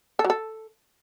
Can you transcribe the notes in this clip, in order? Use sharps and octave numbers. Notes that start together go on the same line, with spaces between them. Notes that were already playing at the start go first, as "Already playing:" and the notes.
A4
F#3
A4